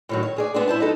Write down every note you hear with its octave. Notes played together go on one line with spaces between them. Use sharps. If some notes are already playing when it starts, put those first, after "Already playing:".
A2 D#3 F#3
C#5
D2 G#4 D5
B3 C4 D4
A#2 E4 C5 A5
F#3 D#4 A4